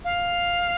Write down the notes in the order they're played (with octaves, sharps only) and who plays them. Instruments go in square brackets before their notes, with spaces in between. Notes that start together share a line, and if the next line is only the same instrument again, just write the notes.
[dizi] F5